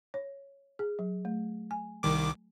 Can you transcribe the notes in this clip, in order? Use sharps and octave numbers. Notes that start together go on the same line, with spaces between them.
C#5
G#4
F#3
A3
G#5
C2 D#3 D6